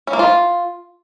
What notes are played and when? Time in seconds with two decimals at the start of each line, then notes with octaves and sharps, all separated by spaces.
0.07 C#4
0.13 A#3
0.19 F4